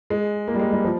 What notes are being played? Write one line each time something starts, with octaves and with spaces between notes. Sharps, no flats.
G#3
A#3
G3
G#3
G3
F3